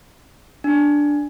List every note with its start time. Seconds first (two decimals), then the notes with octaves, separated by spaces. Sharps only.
0.64 D4